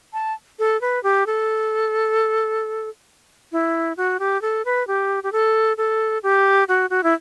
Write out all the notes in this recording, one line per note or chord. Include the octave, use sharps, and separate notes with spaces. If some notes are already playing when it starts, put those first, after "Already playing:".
A5
A4
B4
G4
A4
E4
F#4
G4
A4
B4
G4
G4
A4
A4
G4
F#4
F#4
E4